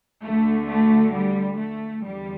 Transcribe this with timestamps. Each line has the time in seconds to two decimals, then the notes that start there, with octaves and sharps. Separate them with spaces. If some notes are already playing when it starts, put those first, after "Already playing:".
0.23 D2 D3 A3
0.68 A3
1.13 G3
1.58 A3
2.04 E2 D3 G3